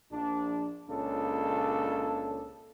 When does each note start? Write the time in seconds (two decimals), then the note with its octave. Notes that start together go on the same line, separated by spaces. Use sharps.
0.12 A#1 D4
0.89 C#2 A#2 C#3 D4 A4